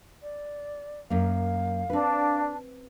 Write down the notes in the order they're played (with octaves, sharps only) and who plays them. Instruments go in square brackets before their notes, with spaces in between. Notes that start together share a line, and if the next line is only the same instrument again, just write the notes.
[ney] D5
[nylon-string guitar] F#2 A#3 [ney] F5
[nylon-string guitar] C4 B4 [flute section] D4